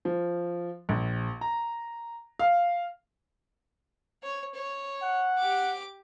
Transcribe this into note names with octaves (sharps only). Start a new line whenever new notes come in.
F3
A#1
A#5
F5
C#5
C#5
F#5
G4 D6